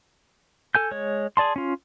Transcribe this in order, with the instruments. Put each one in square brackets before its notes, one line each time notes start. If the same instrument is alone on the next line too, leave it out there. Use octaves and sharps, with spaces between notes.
[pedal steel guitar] A4 G#5 G6
G#3 C#5
G#4 D5 A5 C6
C#4 F4